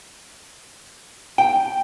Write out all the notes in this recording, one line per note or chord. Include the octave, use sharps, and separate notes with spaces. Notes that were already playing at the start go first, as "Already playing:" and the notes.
G5